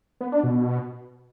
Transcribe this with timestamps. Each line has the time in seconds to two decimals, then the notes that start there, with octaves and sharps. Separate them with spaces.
0.21 B3
0.32 D4
0.43 B2